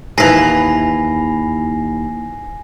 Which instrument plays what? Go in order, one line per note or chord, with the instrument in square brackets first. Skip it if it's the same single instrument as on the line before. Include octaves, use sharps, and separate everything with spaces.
[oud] D#2 E3 [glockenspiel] G#5 A#6 C7